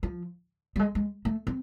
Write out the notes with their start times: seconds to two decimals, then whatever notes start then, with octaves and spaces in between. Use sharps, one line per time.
0.03 F3
0.76 G3
0.79 G#3
0.95 G#3
1.25 A3
1.47 C4